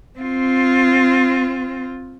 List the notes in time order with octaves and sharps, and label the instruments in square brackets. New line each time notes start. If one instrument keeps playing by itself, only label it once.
[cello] C4 F4